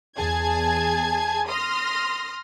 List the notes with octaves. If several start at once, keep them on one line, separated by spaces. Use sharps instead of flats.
E2 G#4 G#5 A5 G#6
C6 D#6 F6 A#6